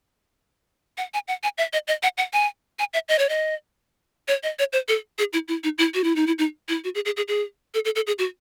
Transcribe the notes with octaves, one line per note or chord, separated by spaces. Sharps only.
F#5
G#5
F#5
G#5
E5
D#5
D#5
F#5
F#5
G#5
G#5
E5
D#5
C#5
D#5
C#5
D#5
C#5
C5
A4
G#4
E4
E4
D#4
E4
F#4
E4
D#4
E4
D#4
E4
F#4
G#4
G#4
G#4
G#4
A4
A4
A4
G#4
F#4